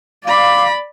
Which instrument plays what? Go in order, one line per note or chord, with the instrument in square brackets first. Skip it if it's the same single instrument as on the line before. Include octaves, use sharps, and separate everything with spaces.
[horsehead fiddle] D5 B5 [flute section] F5 D6